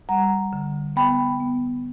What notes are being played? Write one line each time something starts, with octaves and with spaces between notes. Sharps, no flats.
G3 F#5 A#5
D3
B3 G5 B5
B3